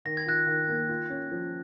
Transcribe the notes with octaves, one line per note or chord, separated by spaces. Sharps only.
D#3 A#6
G#6
F4 F#6 A#6
D#3
A#3
F4
C#4
F3